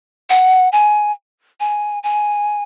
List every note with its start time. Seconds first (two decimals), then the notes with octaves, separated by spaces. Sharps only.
0.30 F#5
0.72 G#5
1.60 G#5
2.03 G#5